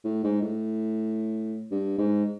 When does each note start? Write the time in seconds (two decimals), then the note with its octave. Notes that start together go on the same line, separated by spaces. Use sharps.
0.05 A2
0.24 G#2
0.42 A2
1.71 G2
1.98 G#2